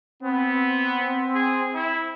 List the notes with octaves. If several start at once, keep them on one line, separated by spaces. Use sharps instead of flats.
B3 C4
G#4
E4